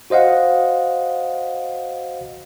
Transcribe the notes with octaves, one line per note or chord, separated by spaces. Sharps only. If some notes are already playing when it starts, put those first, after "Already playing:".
F#4 C5 D#5 F5 F#5